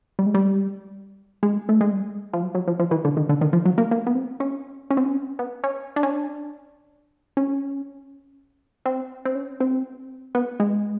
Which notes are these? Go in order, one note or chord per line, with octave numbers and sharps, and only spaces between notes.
G3
G#3
G3
G#3
A3
G#3
G3
F3
F#3
F#3
F3
F3
E3
D3
D#3
D3
D#3
F3
F#3
A#3
A#3
B3
C4
C#4
C#4
C4
C#4
B3
C#4
D4
C#4
D4
C#4
C4
C4
C#4
C4
B3
G#3